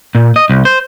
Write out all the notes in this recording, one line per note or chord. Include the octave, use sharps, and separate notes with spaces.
A#2
D#5
C2
C5